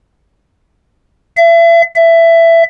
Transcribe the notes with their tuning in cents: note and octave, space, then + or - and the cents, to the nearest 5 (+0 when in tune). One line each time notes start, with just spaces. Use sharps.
E5 +35
E5 +15